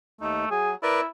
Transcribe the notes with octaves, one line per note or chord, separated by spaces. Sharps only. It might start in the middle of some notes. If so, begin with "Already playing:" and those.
D#2 A3 D#4
F#3 G#4
E4 A#4 B4 D5